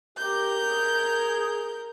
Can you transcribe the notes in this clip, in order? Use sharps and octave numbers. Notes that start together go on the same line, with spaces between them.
G4 A#4 G6
G#4